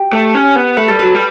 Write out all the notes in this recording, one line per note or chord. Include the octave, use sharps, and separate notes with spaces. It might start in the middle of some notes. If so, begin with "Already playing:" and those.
Already playing: G4
A3
C#4
B3
A3 B4
G3 A4
F#3 B4
G3